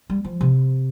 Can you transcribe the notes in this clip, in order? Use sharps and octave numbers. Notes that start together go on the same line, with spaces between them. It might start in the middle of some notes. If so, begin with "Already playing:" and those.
G3
F3
C3